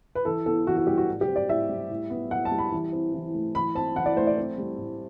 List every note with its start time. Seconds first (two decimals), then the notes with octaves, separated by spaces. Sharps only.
0.15 B4
0.25 E3 A4
0.46 B3 A4
0.67 E3 F#4
0.77 F#4
0.87 G3 G4
0.97 F#4
1.08 A2
1.21 G4
1.28 C4
1.36 D5
1.49 A2 E5
1.69 G3
1.90 A2
2.10 B3
2.31 A2 F#5
2.45 A5
2.52 G3
2.58 B5
2.72 E3
2.93 C4
3.14 E3
3.34 A3
3.55 E3 B5
3.75 C4 A5
3.96 E3 F#5
4.06 D5
4.16 A3 C5
4.27 D5
4.37 C4
4.58 G3
4.78 A2